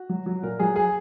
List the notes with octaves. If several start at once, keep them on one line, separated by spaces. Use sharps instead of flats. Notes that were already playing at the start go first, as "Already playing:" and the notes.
Already playing: F#4
F#3
F#3
A#2 A#4
F#3 G#4
G#4